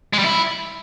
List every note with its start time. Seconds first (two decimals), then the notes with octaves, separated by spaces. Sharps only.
0.13 G#3
0.19 G3
0.24 E4